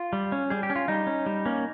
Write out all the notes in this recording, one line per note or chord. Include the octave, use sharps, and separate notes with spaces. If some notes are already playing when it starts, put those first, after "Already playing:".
Already playing: F4
G3
C#4
G3 G#4
G4
C#4
F4
G3 D#4
C#4
G3
A#3 C#4